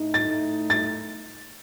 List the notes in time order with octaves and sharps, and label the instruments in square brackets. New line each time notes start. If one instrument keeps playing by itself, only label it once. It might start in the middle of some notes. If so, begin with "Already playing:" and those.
Already playing: [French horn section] A2 A3 D#4
[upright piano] A6
A6